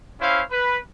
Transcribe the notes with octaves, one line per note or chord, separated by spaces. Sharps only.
C#4 E4 C5 F5
B4